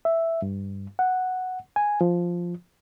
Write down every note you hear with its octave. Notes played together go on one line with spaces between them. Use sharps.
E5
G2
F#5
G#5
F3